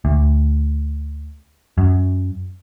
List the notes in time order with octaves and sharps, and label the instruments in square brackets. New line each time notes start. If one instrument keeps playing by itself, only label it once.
[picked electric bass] D2
F#2